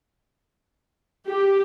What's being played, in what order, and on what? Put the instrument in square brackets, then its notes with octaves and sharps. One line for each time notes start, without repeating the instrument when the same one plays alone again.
[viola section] G4